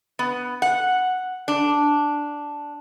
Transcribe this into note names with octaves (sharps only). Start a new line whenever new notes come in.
B3
F#5
D4